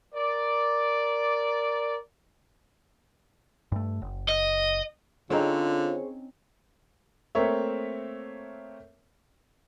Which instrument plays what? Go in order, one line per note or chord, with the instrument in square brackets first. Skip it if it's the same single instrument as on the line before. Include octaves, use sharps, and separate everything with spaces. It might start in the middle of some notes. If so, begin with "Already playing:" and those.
[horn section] A#4 D5
[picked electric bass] G2 A3
F#1
[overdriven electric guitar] D#5
[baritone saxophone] D3 [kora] C4 C#4 D#4 [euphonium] F4 [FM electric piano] G#4 C5 C#5
[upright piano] A3 A#3 C4 A#4 C#5 E5